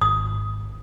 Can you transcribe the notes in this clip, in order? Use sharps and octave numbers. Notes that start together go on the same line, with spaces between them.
G#1 D#6